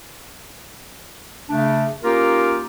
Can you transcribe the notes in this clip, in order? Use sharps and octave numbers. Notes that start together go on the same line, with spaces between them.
C#3 A3 D4
A#3 C#4 D#4 F4 G4 A#4